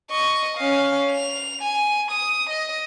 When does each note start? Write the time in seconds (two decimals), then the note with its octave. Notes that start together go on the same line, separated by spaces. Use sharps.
0.11 D#5 C#6
0.58 C#4 F5
1.11 F7
1.62 G#5
2.11 D#6
2.50 D#5